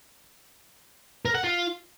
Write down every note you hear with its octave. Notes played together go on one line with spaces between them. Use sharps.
A#4
F#5
F4